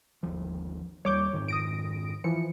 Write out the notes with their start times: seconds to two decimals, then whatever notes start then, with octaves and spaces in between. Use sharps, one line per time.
0.23 G1 D#2 F3
1.05 D#2 G3 C#5 D6 G6
1.33 F2 G#2 D#3
1.48 D#6 A#6 D7
2.24 E3 F3 C#7